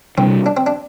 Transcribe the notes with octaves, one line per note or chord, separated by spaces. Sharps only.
C3 G3 C4 D4
D4
C4
D4